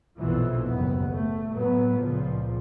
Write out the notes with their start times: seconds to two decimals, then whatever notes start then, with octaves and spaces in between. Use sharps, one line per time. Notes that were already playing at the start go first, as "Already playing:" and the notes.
0.18 A#1 F2 B2 E3 F3
0.65 F#1 D#2 B3
1.10 A3
1.52 A2 F#3 B3
1.96 C#2 A#2 F3